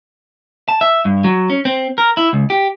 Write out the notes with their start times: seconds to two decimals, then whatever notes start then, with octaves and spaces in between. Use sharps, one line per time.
0.69 A5
0.81 E5
1.05 G2
1.24 F#3
1.50 C#4
1.65 C4
1.98 A#4
2.17 E4
2.33 C#2
2.50 G4